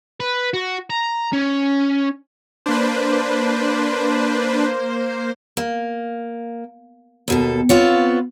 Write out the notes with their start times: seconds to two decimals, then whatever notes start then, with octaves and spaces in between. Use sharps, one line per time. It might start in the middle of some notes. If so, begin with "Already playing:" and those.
0.20 B4
0.54 F#4
0.90 A#5
1.33 C#4
2.66 A#3 D4 B4 C5
5.57 A#3
7.28 D#2 B2 A4
7.69 B3 C4 F4 C#5